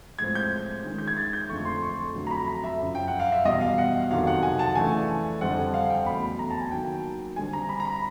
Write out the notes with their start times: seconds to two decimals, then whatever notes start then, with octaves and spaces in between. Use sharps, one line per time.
0.19 A2 F3 G#3 C4 G#6
0.35 G6
0.84 D#3 G#3 C#4
0.98 G6
1.08 G#6
1.17 A6
1.33 G6
1.49 F2 D3 F3 A3 C#6
1.65 C6
1.82 C#6
2.14 F2 D3 F#3 A3
2.27 A#5
2.31 B5
2.48 A#5
2.64 E5
2.80 F#2 C#3 F3
2.95 G5
3.07 F#5
3.20 F5
3.32 E5
3.45 E2 B2 G3 D#5
3.61 F5
3.78 F#5
4.10 F2 C3 D#3 F#3 F5
4.27 F#5
4.43 G#5
4.59 A5
4.75 C#3 E3 A3 D4 F4 G#5
5.41 F2 D3 G3 C4 F#5
5.74 F5
5.90 G5
6.06 E2 C#3 F#3 A3 B5
6.39 A#5
6.50 A5
6.61 G#5
6.71 D#3 F#3 A#3 G5
7.36 D3 G3 C4 G#5
7.53 A#5
7.69 B5
7.80 A#5
7.85 B5